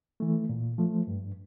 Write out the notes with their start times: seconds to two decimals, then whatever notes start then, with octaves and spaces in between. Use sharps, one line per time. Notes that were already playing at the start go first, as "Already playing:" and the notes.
0.20 E3 A3
0.49 A#2
0.78 F3 A3
1.07 G2